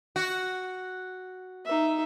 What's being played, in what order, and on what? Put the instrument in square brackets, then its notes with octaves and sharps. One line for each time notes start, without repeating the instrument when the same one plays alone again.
[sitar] F#4
[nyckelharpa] D#4 E5